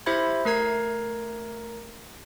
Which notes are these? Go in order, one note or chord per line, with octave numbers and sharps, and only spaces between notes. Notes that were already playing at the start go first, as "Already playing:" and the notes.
E4 G4 C5 E5 B5 G#6
A3 A#4 A#5 G#6 C7